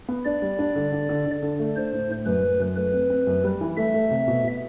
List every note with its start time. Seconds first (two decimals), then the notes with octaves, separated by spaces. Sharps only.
0.09 B3
0.25 D4 D5
0.42 G3
0.59 D4
0.76 D3
0.92 D3
1.09 D3
1.26 D3
1.43 D3
1.59 A3
1.76 D4 C5
1.93 A2
2.09 A2
2.26 F#2 B4
2.44 F#2
2.60 F#2
2.76 A3 B4
2.93 C4
3.10 C4
3.27 F#2
3.44 G3
3.61 E3
3.77 A3 E5
3.94 A3
4.11 C3
4.28 B2
4.44 B2